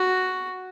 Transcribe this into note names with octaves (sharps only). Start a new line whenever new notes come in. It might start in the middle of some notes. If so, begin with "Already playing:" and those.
Already playing: F#4